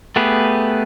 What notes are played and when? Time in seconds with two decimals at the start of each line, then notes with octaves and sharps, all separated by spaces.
0.16 A3 B3 G4 G#4 B4